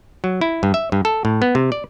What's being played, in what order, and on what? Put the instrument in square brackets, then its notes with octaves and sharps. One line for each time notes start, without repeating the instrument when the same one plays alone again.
[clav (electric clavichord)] F#3
E4
G2
E5
G2
A4
A2
B3
C3
D5